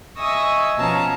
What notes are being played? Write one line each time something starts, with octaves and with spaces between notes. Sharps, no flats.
D#5 E5 G#5 C#6 D#6 E6
B2 F3 C#4 A5 A#5